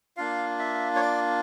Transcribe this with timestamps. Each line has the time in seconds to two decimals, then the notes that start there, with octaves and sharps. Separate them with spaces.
0.17 A#3 D4 F4 F5
0.59 E5
0.95 C#5
1.01 D5